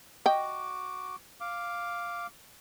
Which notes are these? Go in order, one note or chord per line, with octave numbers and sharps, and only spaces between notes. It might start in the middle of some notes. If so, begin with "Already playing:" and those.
F#4 D#5 G5 D6
F5 D6